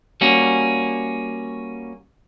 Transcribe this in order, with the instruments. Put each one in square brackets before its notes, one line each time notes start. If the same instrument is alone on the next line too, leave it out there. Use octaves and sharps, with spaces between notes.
[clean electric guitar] G3 A#3 C#4 F#4